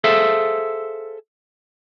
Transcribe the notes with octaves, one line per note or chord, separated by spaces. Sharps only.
G#4 A4 C5 E5 F5